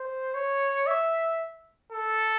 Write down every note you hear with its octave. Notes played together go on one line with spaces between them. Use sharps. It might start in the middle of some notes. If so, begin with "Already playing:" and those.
Already playing: C5
C#5
E5
A4